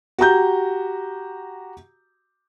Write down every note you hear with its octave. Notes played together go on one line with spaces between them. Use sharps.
F#4 G4 A#5 G6